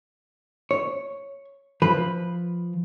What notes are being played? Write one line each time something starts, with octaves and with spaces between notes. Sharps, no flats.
C#5
F3 B4